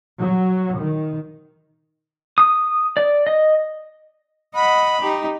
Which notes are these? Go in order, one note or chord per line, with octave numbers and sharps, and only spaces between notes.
F#3
D#3
D#6
D5
D#5
D#5 F#5 B5
D#4 G4